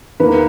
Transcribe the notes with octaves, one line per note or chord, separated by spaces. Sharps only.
E2 D#3 A#3 B4